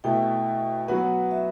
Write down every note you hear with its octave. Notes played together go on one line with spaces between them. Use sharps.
B2 A3 E4 G5
F#3 B3 F#4 B4 F#5
E5